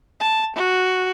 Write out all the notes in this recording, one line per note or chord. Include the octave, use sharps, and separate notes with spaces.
A5
F#4